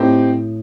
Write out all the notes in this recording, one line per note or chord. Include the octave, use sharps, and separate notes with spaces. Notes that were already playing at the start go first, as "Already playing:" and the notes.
Already playing: A2 C4 D#4 G4